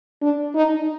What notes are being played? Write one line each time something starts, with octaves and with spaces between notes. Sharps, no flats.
D4
D#4